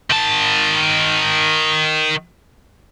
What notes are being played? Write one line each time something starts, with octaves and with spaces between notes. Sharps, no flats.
D#3 A5